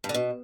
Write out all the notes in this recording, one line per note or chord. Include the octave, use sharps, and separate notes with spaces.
G2
D3
B2